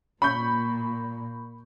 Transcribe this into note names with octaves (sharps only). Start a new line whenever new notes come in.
A#2 B5 C#6 G6